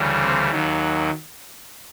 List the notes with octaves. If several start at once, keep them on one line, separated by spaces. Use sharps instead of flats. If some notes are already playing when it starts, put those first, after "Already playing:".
Already playing: D2 C#3 E3 G3
C4
D#2 D#3 F#3